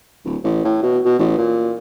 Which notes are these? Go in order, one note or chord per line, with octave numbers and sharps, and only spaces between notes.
D1
A1
A2
B2
B2
A1
A#2